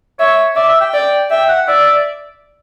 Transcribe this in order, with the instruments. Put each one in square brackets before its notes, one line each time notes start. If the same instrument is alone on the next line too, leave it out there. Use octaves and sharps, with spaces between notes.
[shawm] C#5 [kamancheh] E5
[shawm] D5 [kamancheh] E5
[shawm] E5
G5
[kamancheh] D5
[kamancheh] E5 [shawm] G5
[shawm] F#5
[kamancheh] D5 [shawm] E5